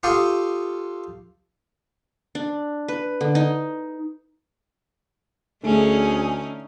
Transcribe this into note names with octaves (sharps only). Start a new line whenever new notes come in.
F4 G4 A4 F5 C#6 D#6
D4
B4
D3
D#4
D2 D3 A3 C#4 D#4 G#4 G#5